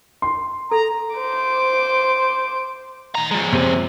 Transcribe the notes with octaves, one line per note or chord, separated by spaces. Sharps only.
C6
A4 A#5
C5 D6
D#3 A#5
F3 G#3
C3